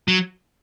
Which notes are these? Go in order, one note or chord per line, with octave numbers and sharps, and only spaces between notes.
F#3